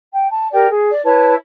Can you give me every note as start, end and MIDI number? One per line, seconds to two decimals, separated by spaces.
0.12 0.30 79
0.30 0.48 81
0.52 0.67 67
0.52 0.67 70
0.52 0.67 74
0.52 0.67 79
0.69 0.89 68
0.90 1.01 74
1.04 1.33 64
1.04 1.33 71
1.04 1.33 73
1.04 1.33 81